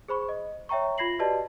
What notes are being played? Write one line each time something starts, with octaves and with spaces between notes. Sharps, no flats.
G#4 C5 B5 C#6
D#5
C#5 E5 G5 A#5 C#6
F4 B5 G#6 A#6 C7 F#7
F#4 G4 B4 D5 D#5 A5